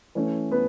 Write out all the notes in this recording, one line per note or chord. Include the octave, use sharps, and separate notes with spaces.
E3 A3 C#4
B3 B4